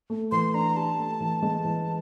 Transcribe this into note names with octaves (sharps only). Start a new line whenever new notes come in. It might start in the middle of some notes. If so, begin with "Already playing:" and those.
A3
E3 C6
D4 A#5
G4 A5
A3
E3
G#3
E3